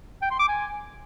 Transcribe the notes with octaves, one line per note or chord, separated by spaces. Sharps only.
G5
C6
D6
G#5